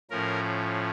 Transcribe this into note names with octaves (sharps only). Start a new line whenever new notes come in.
A2 F3 C#4 A#4